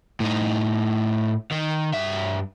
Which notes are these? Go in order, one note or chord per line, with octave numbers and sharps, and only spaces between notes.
A2 D#4
D#3
G2 E5